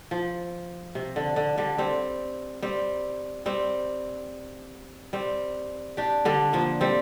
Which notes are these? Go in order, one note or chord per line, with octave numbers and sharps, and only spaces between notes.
F3
C3
D3
D3
D3 G3
G3 C4
G3 C4
G3 C4
G3 C4
D4 G4
D3 G3
F3 A#3
G3 C4